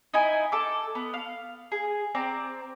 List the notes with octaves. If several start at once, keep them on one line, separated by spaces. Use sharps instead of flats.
D#4 E4 G#5
A4 D6
B3
F5
G#4
C4 D5 A#5